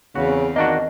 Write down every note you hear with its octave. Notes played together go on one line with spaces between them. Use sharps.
E2 C#3 E3 C4 F#4
D#3 A#3 D4 F#4 D#5